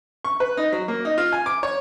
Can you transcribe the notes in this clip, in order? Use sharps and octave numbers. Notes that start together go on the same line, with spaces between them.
C#6
B4
D#4
F#3
A#3
D#4
F4
G#5
D6
C#5